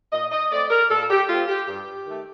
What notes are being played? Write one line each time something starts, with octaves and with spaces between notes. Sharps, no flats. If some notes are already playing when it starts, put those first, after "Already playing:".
A#2 D#5
D#5
A3 C4 D5
A#4
A#2 A4
G4
A3 C4 F4
G4
G2 G4
D#3 A3